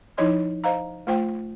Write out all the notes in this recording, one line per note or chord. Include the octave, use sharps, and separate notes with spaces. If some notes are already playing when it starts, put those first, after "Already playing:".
F3 D#4 E4 C#5 D#5 C6
C5 D#5 F5 A#5
A3 F4 C5 G5